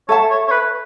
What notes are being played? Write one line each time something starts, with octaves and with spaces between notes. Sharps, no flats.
A4 C#5 E5 A5
C#5
C#5
B4